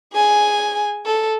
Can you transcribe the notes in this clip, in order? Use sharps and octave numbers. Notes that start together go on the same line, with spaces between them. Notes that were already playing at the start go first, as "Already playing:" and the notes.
G#4 G#5
A4